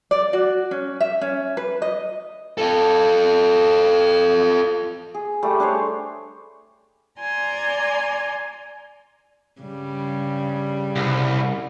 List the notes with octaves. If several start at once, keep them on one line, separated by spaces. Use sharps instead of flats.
D5
F#4
C#4
E5
C#4
B4
D#5
F4 A4
G#4
G3 A3
D4 G#4 C5 C#5
D5 G#5 A#5 C6
G2 C#3 G3
C2